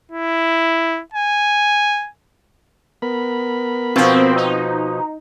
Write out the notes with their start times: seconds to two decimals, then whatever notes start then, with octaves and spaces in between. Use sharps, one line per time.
0.12 E4
1.14 G#5
3.02 B3 A#4 B5
3.96 B2 F3 C4
4.36 D#4